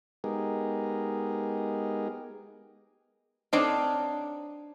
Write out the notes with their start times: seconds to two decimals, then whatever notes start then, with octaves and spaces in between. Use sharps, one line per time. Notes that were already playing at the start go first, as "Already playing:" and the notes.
0.24 G#3 B3 D#4 G4 G#4 A#4
3.53 C4 D4 D#4 C#5 F5